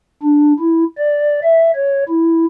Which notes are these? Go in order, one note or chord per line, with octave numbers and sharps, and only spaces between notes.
D4
E4
D5
E5
C#5
E4